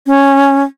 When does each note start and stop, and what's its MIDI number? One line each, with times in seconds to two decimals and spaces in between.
0.06 0.63 61